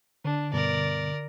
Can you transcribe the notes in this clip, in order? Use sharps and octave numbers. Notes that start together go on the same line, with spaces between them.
D3 D4
G2 B2 B3 A#4 D5